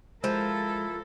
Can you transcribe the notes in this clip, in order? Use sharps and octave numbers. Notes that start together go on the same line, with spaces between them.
F3 G#3 E4 A4 A#4